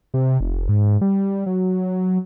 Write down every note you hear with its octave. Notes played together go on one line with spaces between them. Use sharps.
C3
F1
G#2
G3
F#3